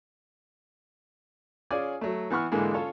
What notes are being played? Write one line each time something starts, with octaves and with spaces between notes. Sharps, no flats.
C#4 F4 G#4 D5 G#5
F#3 A3
E3 B3 F#5 C#6 F6
G#2 D3 E3 G#3 A#3
C#4 F4 A4 C#5